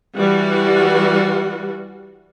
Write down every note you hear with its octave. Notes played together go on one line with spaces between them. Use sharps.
E3 G3 F#4